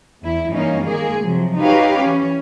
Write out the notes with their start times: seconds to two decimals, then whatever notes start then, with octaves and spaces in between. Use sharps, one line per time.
0.22 E2 E4
0.52 G2 E3 A#3 C#4 D#4 F5
0.85 D#3 G#3 A#3 G#4
1.23 C3 F3 F#3
1.58 D#4 F#4 G4 B4 C#5 F5
2.00 E3 C#4